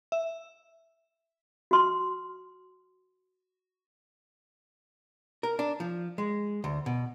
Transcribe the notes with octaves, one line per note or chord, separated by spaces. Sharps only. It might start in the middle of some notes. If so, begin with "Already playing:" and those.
E5
F#4 C6
A#4
D4
F3
G#3
D2
B2